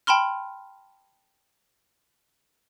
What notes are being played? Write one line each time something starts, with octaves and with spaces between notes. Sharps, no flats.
G5 A5 B5 C6 F6